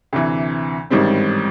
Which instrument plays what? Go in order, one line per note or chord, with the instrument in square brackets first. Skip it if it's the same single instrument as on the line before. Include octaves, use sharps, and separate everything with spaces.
[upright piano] D2 C3 E3
A1 G#2 D#3 G3 C4